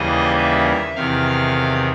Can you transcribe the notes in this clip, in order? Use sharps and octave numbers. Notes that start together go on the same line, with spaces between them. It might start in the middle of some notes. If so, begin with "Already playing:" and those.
Already playing: D#2 C#3 E3 G3 A#3 D#5
E5
E2 C3 D#3 F5